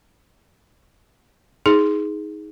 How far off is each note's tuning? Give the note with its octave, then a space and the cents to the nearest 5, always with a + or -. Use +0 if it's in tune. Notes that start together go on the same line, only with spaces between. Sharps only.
D#4 +20 G#4 +0